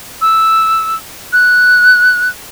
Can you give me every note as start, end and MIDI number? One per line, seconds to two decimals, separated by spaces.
0.21 0.96 88
1.33 2.29 90